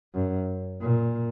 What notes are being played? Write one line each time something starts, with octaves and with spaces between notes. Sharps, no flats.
F#2
A#2